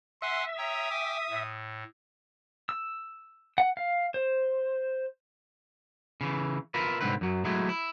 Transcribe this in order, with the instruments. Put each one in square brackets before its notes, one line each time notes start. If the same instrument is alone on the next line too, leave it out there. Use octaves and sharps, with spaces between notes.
[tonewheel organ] E5 [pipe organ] F#5 G#5 F#6 [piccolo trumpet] C6
[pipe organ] C#5 G5 A#5 [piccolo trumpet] D#6
[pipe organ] G5 G#5 D6
A2
[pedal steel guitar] E6
F#5
F5
C5
[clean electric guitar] C#3 E3
E4 F4 A#4 B4
C2 F2 G#2 D3 C4 B4
F#2 F#3
F#3 G#3 A3 E4
E4